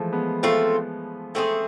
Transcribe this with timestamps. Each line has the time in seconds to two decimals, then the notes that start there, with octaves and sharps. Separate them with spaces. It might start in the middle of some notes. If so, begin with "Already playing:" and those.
Already playing: E3 F3 G#3 A3
0.12 G#3 B3
0.43 A3 C4 F4
1.35 A3 C4 G#4